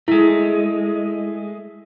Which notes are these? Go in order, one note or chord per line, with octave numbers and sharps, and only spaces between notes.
G#3 A3 E4